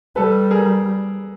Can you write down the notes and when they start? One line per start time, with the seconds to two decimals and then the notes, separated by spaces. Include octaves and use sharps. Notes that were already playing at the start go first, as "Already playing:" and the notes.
0.16 G3 A4 B4
0.51 G#4 A#4